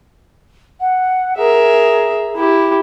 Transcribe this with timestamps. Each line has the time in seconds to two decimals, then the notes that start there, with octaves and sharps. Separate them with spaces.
0.80 F#5
1.37 G#4 A#4 E5
2.36 E4 G4